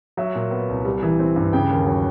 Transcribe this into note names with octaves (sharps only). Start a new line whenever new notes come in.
F#3 E5
A#2
B3
C2
G3
E3
C4
G2
C#3 G5
D#2
F#3